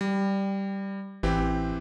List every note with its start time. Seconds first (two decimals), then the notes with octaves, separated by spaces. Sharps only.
0.01 G3
1.23 A1 E3 C4 G4